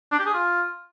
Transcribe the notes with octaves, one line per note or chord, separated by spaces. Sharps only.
D4
G4
G#4
F4